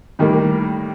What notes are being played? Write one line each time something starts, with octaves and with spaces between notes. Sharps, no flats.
A2 D#3 G3 A#3